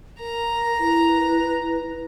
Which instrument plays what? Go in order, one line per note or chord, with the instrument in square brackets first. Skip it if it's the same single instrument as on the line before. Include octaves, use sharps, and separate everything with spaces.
[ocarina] A#4 [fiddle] A#5
[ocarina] E4 [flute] B4